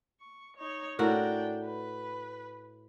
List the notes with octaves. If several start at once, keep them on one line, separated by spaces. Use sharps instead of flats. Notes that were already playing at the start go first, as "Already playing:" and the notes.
C#6
D#4 C#5
A2 D4 F#4 A#4 G5
B4